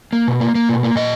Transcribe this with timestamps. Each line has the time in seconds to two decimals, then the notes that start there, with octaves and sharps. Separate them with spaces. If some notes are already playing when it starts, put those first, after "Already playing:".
0.13 A#3
0.28 B2
0.40 A#3
0.55 A#3
0.69 B2
0.83 A#3
0.96 A#2 D#5